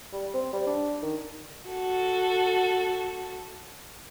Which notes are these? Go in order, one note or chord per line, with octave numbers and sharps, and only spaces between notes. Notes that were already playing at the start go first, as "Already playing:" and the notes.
G3
C4
G3
D4
D#3
F#4 A4